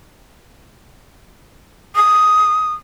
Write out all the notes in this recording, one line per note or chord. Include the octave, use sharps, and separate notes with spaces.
D#6